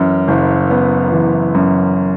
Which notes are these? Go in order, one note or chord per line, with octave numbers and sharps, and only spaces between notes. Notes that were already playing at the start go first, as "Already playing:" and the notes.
Already playing: F#2 E3
F#1
B3
E3
F#2